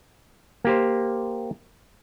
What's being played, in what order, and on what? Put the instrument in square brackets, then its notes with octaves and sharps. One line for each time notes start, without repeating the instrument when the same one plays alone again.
[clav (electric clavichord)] A#3 G4 C5